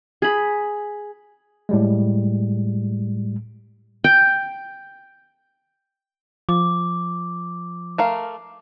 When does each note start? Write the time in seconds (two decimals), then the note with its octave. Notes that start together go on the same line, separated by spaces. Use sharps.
0.22 G#4 B5
1.69 A2 G3 G#3
4.04 G5
6.49 F3 D6
7.98 A3 A#4 F5